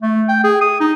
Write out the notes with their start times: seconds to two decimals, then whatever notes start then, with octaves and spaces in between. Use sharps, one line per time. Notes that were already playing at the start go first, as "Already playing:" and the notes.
0.02 A3
0.29 G5
0.44 G#4
0.61 D#6
0.80 D#4